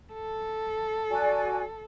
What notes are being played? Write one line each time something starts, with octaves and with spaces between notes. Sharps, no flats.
A4
F#4 D5 G#5